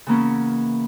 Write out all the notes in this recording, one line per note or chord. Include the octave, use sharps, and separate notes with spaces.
C#3 E3 A#3 B3 C#4